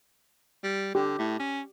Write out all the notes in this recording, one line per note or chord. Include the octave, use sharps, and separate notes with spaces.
G3
D3 G4
A2
C#4